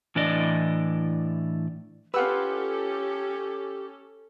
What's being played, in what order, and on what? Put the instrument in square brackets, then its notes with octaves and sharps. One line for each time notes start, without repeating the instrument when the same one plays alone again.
[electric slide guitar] A2 E3 D4 E4 D5 D#5
[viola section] C#4 A4 [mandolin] F4 F#5 E6 [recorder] G4 [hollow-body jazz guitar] B4